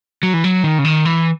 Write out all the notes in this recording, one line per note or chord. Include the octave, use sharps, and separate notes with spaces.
F#3
E3
F#3
D#3
C#3
D#3
E3